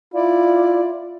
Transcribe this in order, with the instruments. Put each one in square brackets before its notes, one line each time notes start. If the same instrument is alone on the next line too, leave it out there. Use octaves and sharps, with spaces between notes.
[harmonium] E4 [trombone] F4 [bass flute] D5